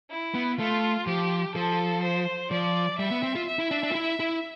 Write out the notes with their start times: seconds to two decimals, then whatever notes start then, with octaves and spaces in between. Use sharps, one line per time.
0.10 E4
0.34 B3
0.58 A3 F4
1.07 F3 G4
1.55 F3 A4
2.02 C5
2.51 F3 D5
2.98 G3 E5
3.11 B3
3.23 C4
3.35 F4
3.48 E5
3.59 E4
3.71 D4
3.83 D4
3.92 F4
3.95 E4
4.20 E4